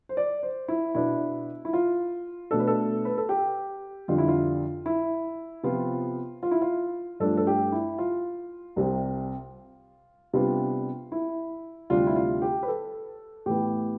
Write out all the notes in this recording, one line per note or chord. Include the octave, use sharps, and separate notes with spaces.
C5
D5
C5
E4
B2 B3 D4 E4
E4
F4
B2 A3 D4 A4
B4
A4
B4
A4
G4
F2 D3 G3 D4 F4
E4
F4
E4
C3 F3 B3 F4
F4
E4
F4
G2 F3 A3 D4 A4
A4
G4
E4
F4
C2 C3 G3 C4
C3 G3 B3 D4 F4
E4
D2 C3 G3 D4 F4
E4
F4
G4
B4
A4
A2 E3 B3 G4